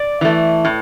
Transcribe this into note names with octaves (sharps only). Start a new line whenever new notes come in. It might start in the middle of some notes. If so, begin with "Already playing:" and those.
Already playing: D5
E3 A3
A2